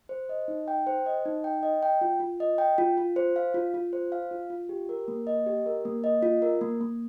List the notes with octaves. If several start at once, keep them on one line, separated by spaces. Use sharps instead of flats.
C5
D#5
D#4
G5
C5
D#5
D#4
G5
D#5
G5
F4
F4
D#5
G5
F4
F4
C5
F5
F4
F4
C5
F5
F4
F4
G4
A#4
A#3
D#5
G4
A#4
A#3
D#5
F4
A#4
A#3
A#3